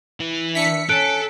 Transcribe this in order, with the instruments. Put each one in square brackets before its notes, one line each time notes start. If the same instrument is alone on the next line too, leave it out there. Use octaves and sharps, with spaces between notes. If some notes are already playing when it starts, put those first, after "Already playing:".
[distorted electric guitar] E3
[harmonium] D4 E5 [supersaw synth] B6 C#7
[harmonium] C#4 [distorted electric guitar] A4 [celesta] F#6 D7